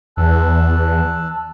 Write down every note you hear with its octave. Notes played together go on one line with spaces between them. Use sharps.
E2 A5 E6 F#6